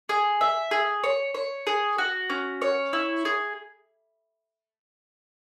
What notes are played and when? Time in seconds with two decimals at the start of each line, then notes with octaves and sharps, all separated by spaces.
0.09 G#4
0.41 E5
0.71 G#4
1.04 C#5
1.34 C#5
1.67 G#4
1.98 F#4
2.30 C#4
2.62 C#5
2.93 E4
3.25 G#4